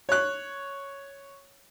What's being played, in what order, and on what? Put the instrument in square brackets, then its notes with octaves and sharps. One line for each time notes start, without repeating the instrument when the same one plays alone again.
[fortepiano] C#5 F#6